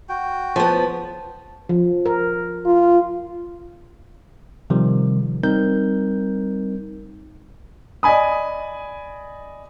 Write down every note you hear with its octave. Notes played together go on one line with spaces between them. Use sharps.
F#4 G5
F3 B3
F3
A#4
F4
C3 D#3 F3 G3
G3 C4 D#4 A#4 G6
D5 D#5 G#5 B5 D#6